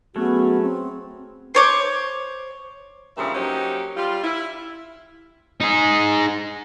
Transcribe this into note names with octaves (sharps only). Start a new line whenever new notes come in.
F#3 A3 B3 C#4 F#4 G#4
C4
C5 C#5 D6
G2 A#2 C#3 F3 E5
F#3 A#3 C#4 D#4 G4 C5
G3 F4
E4
D#4 G#4